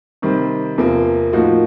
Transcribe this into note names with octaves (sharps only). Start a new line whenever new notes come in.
C3 D#3 G3 C4
E2 C3 F3 A#3
A2 F3 A#3 D#4 F#4